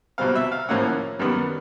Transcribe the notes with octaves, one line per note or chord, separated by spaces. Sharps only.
C2 B2 G3 C4 F5
E5
F5
A2 F3 A#3 C#4 F#5
F#2 D#3 G3 B3